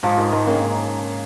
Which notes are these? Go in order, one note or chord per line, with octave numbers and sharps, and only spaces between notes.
G#2 F3
G#2 D#3
G#2 D#3
C#3 A#3